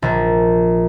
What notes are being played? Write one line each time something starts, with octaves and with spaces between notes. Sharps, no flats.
A#1